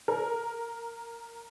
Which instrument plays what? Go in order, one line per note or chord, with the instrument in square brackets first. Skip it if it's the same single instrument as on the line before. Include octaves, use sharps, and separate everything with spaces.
[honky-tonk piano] A#4